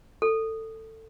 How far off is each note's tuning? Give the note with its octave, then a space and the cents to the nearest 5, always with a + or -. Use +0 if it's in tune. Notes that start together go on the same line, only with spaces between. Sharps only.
A4 +20